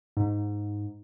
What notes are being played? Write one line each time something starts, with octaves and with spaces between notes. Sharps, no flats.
G#2